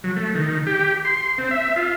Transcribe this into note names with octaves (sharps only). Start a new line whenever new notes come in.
F#3
A3
D#3
G4
C6
C4
E5
F4